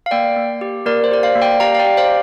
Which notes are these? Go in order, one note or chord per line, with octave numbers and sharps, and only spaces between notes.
F5
A#3 D5 G5
A#3
G4
A#3 A#4 D5
C5
G4 D5
C5 F5
A#3
D5 G5
G4 F5 A#5
F5
D5 G5
G4
C5 F5